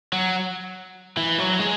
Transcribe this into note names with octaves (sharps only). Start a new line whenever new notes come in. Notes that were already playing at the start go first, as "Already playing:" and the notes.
F#3
E3
F#3
G#3